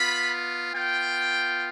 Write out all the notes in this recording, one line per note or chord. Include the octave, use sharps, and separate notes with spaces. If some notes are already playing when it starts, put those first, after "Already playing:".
Already playing: B3 F4 B5
B3 F4 G5